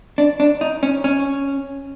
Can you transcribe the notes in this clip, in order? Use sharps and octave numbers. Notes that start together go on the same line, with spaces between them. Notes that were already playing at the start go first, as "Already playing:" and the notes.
D4
D4
D#4
C#4
C#4